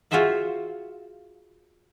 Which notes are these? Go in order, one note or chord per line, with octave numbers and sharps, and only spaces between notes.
F4 F#4 G#4 C5 E5 F#5